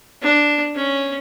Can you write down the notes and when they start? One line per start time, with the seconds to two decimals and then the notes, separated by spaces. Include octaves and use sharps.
0.22 D4
0.75 C#4